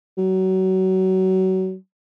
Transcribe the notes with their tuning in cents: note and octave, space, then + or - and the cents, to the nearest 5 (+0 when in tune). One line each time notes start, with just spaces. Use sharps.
F#3 +25